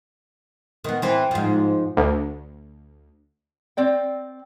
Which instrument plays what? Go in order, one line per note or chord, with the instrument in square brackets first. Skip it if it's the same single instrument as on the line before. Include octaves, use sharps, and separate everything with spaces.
[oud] D#3 B3
E3 C4
G#2 F3
[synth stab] D2
[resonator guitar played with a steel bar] C4 D5 G5